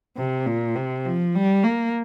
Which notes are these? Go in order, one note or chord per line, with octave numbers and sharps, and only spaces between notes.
C3
A#2
C3
F3
G3
A#3